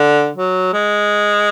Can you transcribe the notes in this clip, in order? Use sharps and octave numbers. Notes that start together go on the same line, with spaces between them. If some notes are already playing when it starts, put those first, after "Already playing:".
Already playing: D3
F#3
G#3